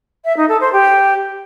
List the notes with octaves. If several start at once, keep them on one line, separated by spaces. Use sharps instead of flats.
E5
D#4
A4
C5
G4